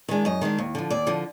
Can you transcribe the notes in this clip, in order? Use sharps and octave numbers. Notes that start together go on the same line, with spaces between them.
D#3 G#3 D4
F#2 D#5
D#3 G#3 D4
D#2
D3 F3
D#2 D5
D3 F3